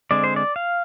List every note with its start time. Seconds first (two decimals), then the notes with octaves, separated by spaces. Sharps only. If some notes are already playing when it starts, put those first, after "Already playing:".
0.11 D3 G#3 C4 D5
0.24 C5
0.36 D5
0.56 F5